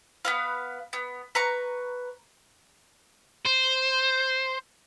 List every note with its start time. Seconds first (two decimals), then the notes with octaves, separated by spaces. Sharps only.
0.25 B3 B4 F5
0.93 B3
1.35 B4 A#5 C#6
3.45 C5